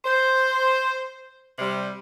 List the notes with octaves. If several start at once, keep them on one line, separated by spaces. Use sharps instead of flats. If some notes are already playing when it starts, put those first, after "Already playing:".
C5
C3 G3